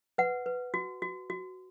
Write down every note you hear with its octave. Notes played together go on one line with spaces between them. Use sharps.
B4 F#5
B4
F#4
F#4
F#4